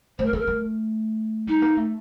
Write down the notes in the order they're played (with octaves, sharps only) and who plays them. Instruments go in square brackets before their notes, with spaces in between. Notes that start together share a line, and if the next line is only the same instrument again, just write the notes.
[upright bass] A3 [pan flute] C5
[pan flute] A#4
[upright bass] A#3 [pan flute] A4
[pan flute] A#4
[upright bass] A3
[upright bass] G3 [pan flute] D#4
[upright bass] A#3
A3